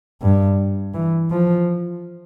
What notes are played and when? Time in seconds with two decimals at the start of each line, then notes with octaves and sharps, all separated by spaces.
0.22 G2
0.94 E3
1.31 F3